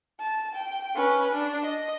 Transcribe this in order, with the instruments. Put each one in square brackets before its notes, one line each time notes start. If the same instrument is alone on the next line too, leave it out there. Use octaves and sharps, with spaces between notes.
[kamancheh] A5
G5
C#4 B4
D4
D#5